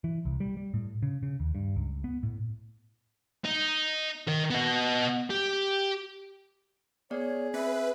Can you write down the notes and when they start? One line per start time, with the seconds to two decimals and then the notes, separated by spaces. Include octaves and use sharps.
0.04 E3
0.25 C2
0.40 G3
0.57 G3
0.74 A2
1.03 C#3
1.23 C#3
1.40 D#2
1.55 G2
1.76 C#2
2.04 B3
2.23 A2
3.45 D#4
4.28 D#3 A#4
4.51 B3 D#5
5.31 G4
7.11 B3 G#4 C#5 D5
7.54 C4 B4 E5